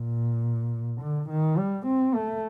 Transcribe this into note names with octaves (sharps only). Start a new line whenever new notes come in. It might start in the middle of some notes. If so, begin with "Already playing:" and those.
Already playing: A#2
D3
D#3
G3
C4
A3